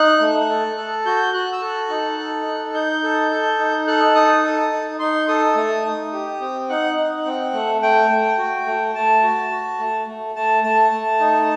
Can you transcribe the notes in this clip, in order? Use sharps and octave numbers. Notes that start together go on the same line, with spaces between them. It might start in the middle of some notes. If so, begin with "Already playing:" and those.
Already playing: D#4 F#6
A3
A4
A4
F#4 G6
F#4 F#6
E6
A4 F#6
D#4
A4
D#4
D#4 G6
A4
A4
D#4
A4 F#6
D#4 D#6
A4
D#4
D#4 C6
A4 D#6
A3 D#6
D#4
G4
C4
D#4 F#5
D#4
C4
A3
A3 G5
A3
F#4
A3
A3 A5
F#4
F#4
A3
A3
A3 A5
A3 A5
A3
D#4